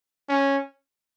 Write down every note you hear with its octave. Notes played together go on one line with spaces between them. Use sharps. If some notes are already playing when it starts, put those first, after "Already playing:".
C#4